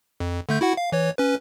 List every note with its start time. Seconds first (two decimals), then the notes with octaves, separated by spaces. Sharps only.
0.20 F2
0.49 D3 A3 G6
0.61 E4 F#4 F#5
0.77 F5
0.92 E3 C#5
1.18 C#4 B4